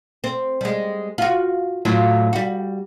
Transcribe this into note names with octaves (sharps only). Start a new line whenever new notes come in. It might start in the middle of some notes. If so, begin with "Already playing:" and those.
C4
G3 G#3
F4 F#4
A2 F#3 F4
G3 F#4